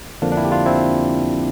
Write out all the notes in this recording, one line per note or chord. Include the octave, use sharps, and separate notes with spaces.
F2 D3 F3 A#3 D4
D4
C4 E4
G4
D4 F4
C4 E4